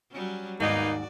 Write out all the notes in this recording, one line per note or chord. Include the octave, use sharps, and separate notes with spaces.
F#3 G3 C#4
D#2 G#2 D#3 A#3 B3 D#4 F#4 D5